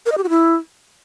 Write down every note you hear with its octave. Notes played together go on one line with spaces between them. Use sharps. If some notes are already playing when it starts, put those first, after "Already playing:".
A#4
D#5
G4
F#4
E4